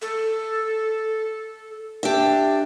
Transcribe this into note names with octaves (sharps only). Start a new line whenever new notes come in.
A4
D4 G4 E5